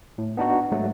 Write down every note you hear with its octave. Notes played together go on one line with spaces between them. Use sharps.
A2
B3 D4 D#4 F#4
G#2 F#3 G#3 A3